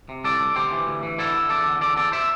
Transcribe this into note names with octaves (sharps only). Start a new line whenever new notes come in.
C3
C2 A4 D5
C2
D2 G4 C5
E3
D2
E3
D3 E4 A4
D3
E2 A4 D5
D3
E2 A4 D5
E2 A4 D5
C5 E5